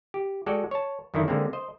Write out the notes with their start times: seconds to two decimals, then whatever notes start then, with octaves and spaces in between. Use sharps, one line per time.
0.14 G4
0.46 G#3 F#4 A4 D5 G5
0.71 C#5 A5
1.14 F#2 D3 D#3 D#4 E4
1.28 D3 G#3 A#3 C4
1.53 C5 D#5